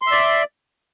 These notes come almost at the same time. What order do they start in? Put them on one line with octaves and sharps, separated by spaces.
C6 E5 D5